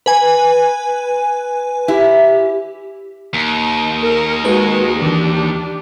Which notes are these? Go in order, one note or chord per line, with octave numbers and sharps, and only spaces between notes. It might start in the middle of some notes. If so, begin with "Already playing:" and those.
B4 G#5
E4 G4
D#2
A#4
D#3 G#3 F#4 B4
D#3 E3 D4 G4